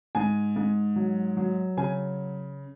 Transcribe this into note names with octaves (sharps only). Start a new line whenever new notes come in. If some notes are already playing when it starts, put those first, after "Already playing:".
G#2 G#5
G#2
F#3
F#3
C#3 G#5